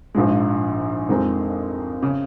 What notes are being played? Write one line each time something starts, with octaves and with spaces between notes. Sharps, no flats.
A#1 G#2 F3 G#3
F2 D#3 G#3 C4 D#4
C#3